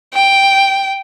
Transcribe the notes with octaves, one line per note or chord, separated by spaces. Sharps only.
G5